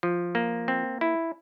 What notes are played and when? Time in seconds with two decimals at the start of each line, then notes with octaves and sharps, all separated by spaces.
0.03 F3
0.35 A#3
0.68 C4
1.01 E4